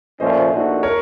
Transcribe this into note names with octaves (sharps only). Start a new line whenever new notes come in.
A#2 F3 A3 C#4 F4 C5 D#5
A#1 A#2 A3 D#4 F#4
A#4 C#5